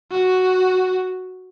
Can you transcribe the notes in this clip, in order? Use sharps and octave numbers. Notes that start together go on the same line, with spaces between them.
F#4